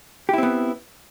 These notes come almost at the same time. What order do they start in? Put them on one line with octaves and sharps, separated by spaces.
G4 E4 C4 B3